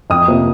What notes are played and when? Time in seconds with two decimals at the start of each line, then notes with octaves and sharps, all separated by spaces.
0.10 F2 D#6
0.28 C3 F3 A#3